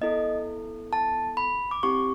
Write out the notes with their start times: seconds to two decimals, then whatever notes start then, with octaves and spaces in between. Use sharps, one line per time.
0.01 B3 E4 A4 D#5
0.93 A5
1.37 B5
1.71 D6
1.83 C4 E4 G4 C#6